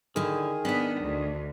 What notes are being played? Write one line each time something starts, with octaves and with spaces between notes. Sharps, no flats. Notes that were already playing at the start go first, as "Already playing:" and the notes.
D3 D#3 E4 G#4
B3 D4 D#5
D2